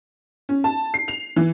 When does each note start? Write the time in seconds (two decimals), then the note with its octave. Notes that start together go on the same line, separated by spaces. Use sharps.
0.49 C#4
0.64 A5
0.94 C7
1.08 F7
1.36 E3